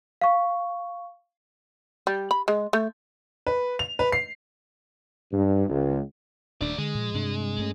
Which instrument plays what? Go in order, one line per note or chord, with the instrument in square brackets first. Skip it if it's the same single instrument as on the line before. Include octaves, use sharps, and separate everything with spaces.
[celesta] F5 C#6
[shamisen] G3
B5
G#3
A3
[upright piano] B4
F7
B4
C7
[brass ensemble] G2
C#2
[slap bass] D#1 D4 [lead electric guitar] A3 D5
[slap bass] D3 [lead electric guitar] G#3
[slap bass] A#2 F3
G2 C3 D4
G2 A3 C#4